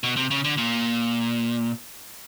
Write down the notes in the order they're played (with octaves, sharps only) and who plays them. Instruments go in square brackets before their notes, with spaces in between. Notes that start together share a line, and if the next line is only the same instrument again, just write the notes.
[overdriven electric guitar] B2
C3
C#3
D3
A#2